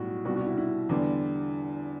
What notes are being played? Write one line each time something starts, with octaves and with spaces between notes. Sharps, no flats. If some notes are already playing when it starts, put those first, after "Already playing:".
Already playing: B1 A2 G3 F#4
C2 B2 G3 F#4
F#4
E4
E4
E2 D3 G3